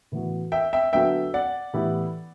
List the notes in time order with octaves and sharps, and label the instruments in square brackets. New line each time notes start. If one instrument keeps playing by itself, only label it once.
[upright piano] A2 E3 B3 F#4
[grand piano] E5 G5
E5 G5
[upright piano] D3 F#3 B3 F#4 A4 [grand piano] E5 G5
[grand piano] D5 F#5
[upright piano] A2 E3 B3 E4 G4